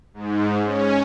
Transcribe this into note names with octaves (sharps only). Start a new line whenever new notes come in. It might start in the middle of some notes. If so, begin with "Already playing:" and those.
G#2
C#4